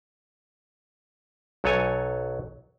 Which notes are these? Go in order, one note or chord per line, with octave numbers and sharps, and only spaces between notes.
B1 F#3 A4 C#5 G#5